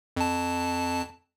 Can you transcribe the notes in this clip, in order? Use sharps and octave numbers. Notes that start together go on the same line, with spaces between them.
F2 A5